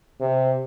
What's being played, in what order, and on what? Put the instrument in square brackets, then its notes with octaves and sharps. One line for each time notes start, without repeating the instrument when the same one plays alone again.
[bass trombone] C3